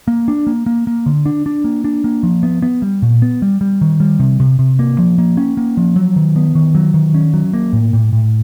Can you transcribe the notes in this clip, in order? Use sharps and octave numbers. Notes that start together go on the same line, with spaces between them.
A#3
D4
A#3
A#3
A#3
D3
D4
D4
A#3
D4
A#3
F3
B3
B3
G3
A#2
B3
G3
G3
D#3
G3
C3
C3
C3
A#3
F3
A#3
C#4
A#3
F3
F#3
D#3
B3
D#3
F#3
D#3
C#4
F#3
A#3
A2
A2
A2